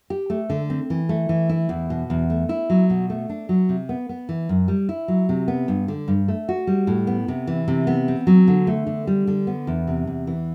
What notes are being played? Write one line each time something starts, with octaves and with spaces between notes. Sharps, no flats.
G4
A3
D3
C4
E3
A3
E3
E4
E2
B2
E2
A3
E4
F#3
B2
A3
D4
F#3
C3
B3
B3
E3
F#2
G3
E4
F#3
C3
B3
G2
D3
G2
A3
F#4
G3
A2
B3
C3
E3
C3
B3
C4
F#3
D3
A3
D3
G3
D3
B3
E2
C3
E2
E3